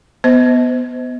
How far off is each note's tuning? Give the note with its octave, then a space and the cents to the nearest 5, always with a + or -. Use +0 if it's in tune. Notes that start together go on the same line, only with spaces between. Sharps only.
B3 +0 C5 -30 D#5 +35